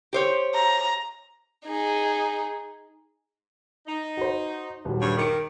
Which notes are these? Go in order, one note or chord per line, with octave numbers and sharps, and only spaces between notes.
G4 C5 C#5
A#5
D#4 G#4
D#4
F#4 C5
D#1 F#3
G2 C#3 C#5
D#3 D6 C#7 D7